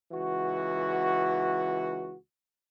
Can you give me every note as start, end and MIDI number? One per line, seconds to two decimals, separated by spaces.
0.12 2.15 37
0.12 2.15 52
0.12 2.15 66